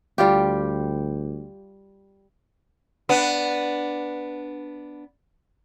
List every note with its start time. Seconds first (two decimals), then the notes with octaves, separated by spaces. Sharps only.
0.18 D2 G3 F4 G4
3.09 B3 D4